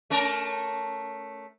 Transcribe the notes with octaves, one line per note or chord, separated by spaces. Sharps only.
A3 C#4 A#4